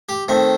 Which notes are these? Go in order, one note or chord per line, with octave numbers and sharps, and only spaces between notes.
G4
D#3 A3 C4